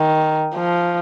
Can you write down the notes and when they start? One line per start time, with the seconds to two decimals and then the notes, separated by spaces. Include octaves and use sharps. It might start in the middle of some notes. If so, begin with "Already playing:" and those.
Already playing: D#3
0.54 F3